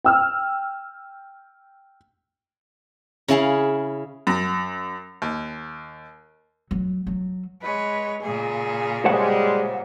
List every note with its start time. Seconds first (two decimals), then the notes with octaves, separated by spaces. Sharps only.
0.05 G5 E6 F6
3.28 C#3 E4 G#4 F5
4.27 F#2
5.22 D#2
6.71 F#3
7.07 F#3
7.62 G#3 B4 C#5
8.23 A#2 C#3 G#4
9.05 G3 G#3 C5 C#5 F#5